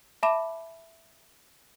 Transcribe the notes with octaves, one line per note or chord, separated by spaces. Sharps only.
E5 A5 B5 D6 E7